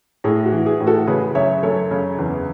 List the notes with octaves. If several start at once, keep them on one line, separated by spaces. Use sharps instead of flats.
A2 G#4
F#4
E3
G#4
A2
F#4 A4
C#3 G#4 B4
F#2 C#5 E5
F#2 A4 C#5
C#3
E2